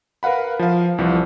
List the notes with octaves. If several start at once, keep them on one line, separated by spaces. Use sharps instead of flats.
A#4 B4 F5 F#5 B5
F3 F5
C2 E3 F3